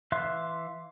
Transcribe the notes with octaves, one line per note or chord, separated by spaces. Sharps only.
E3 E5 F5 C6 F#6